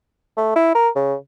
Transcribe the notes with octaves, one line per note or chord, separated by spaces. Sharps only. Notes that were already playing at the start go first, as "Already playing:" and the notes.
A3
E4
A#4
C#3